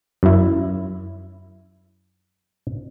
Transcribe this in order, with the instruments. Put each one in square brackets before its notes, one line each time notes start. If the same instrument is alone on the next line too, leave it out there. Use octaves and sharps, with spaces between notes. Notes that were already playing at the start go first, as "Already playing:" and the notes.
[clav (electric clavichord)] F#2 E4